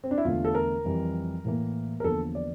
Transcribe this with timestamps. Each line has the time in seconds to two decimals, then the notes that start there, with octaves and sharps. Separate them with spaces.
0.04 C4
0.11 D4
0.18 E4
0.25 E2 D3 A3 F4
0.45 A4
0.55 A#4
0.85 F2 E3 G3
1.45 A2 E3 A#3
2.00 A#4
2.04 E2 D3 F3 A#3 A4
2.35 D5